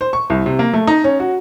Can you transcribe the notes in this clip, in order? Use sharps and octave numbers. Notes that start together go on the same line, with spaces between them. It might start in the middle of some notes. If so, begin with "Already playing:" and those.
C5
C#6
C2
C3
A#3
A3
D#4
C#4
F#4